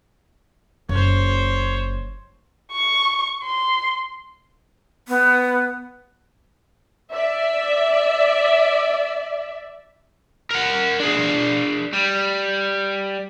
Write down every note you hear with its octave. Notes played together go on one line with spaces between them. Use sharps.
F#1 C5 C#5
C#6
C6
B3
D5 E5
A#4 F#5
D4 G#4
G3